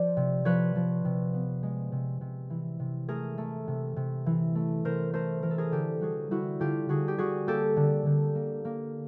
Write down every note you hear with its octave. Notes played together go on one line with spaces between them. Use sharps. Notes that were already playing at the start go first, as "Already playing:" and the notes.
Already playing: F3 C5 D5
C3
F3 B4 C#5
F3
C3
B3
G#3
C3
C3
E3
C3
A3 G#4 A#4
A3
C3
C3
E3
A3
C3 A#4 C5
A3 A#4 C5
E3 A#4
A4
G#4 A#4
D3 G4 A4
G3 F#4 G#4
G3 E4 F#4
D3 F4 G4
D3 F#4 G#4
G4
G3 F#4 G#4
A#3 G4 A4
D3
D3
A#3
A#3